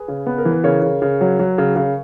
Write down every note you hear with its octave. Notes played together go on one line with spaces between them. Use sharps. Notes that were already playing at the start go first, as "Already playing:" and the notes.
Already playing: G#4 B4
C#3
B3
A#4
E3
B4
C#3 A#4 C#5
C#3
C#3
F#3
F#3
C#3
C#3